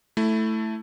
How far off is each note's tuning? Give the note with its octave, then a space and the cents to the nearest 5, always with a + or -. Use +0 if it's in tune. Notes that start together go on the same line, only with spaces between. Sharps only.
A3 +0 E4 +0